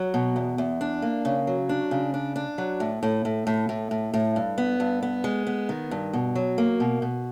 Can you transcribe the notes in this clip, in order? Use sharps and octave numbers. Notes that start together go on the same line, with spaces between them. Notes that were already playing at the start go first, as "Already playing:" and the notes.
Already playing: F#3
B2
E2
E2
D4
A#3
C#3
F#3
D4
C#3
D4
D4
F#3
A2
A2
A2
A2
A2
A2
A2
G2
B3
G2
B3
G#3
B3
D#3
G2
B2
F#3
A#3
B2
B2